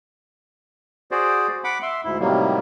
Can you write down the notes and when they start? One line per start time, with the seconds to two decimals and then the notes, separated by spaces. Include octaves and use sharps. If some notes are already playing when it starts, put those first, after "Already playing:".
1.11 F#4 G#4 C5 D5
1.64 F#5 B5 D6
1.82 E5 C6
2.04 D2 G#2 E4
2.20 A2 C3 D#3 F#3 G3 A#3